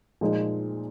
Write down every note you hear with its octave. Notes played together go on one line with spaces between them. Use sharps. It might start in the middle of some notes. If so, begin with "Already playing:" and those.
A#2 F3 G#3 D#4